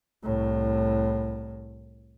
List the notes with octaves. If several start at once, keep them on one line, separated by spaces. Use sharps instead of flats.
C2 A2